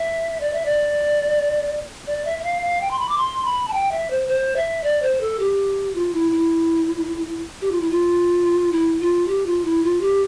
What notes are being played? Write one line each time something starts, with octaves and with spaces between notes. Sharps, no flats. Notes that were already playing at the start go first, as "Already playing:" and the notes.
Already playing: E5
D5
E5
D5
D5
E5
E5
F5
F5
G5
C6
B5
D6
C6
B5
A5
G5
E5
C5
C5
E5
D5
C5
A4
G4
F4
E4
E4
G4
F4
E4
F4
E4
F4
G4
F4
E4
F4
G4